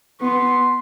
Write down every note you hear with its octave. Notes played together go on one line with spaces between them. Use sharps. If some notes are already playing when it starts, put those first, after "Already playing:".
B3 C6